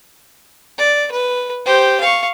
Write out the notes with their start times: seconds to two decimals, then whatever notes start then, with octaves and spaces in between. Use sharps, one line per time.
0.78 D5
1.12 B4
1.66 G4 C5
2.00 F5 C#6